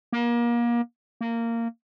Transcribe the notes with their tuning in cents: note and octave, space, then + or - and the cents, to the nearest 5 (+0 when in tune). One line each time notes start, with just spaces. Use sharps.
A#3 +30
A#3 -15